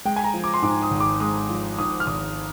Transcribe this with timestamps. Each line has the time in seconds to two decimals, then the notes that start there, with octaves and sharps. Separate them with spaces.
0.05 G#3 G5
0.16 G#5
0.24 A#5
0.34 F3
0.44 D6
0.54 C6
0.62 G#2 D6
0.82 D#6
0.91 G#1
1.00 D6
1.20 G#3 D#6
1.49 F3
1.79 G#2 D#6
2.00 F6
2.07 G#1 D#6